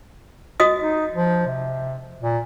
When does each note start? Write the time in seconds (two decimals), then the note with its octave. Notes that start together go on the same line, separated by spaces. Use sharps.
0.60 F#4 D#5 D#6
0.81 D#4
1.15 F3
1.47 C3
2.21 A#2